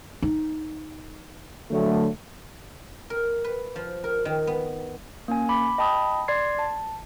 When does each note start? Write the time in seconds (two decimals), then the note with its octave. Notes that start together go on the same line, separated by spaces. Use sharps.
0.22 D#4
1.71 D3 F#3 A3
3.10 A#4
3.44 B4
3.76 F3
4.04 A#4
4.25 D#3
4.47 B3
5.28 A#3 C#4 G#5
5.49 B5 D6
5.78 D#5 G5 A5 B5 D#6
6.28 D5 C6 G#6 C7
6.59 A5